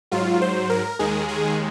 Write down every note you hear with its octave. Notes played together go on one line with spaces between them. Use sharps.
G#2 F#3 F4
C5
A#4
D#2 D#3 G#3 G#4
G#4